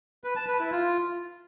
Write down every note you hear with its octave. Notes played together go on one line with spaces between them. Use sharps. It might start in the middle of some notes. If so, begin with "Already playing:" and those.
B4
A5
B4
E4
F4